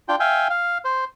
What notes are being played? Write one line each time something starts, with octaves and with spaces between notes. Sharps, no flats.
D4 F4 G5
E5 F5 G5 G#5
F5
C5